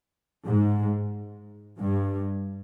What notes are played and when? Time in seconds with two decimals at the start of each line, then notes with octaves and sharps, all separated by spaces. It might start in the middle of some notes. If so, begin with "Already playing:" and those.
0.46 G#2
1.80 G2